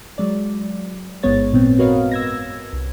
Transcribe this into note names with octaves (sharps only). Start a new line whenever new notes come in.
F#3 G#3 D5
A1 G#2 G#3 B3 C#5 A6
F#2 A#2 B3 C4
F#4 A#4 B4 C#5 D#5 F5
E6 G#6 A#6
C2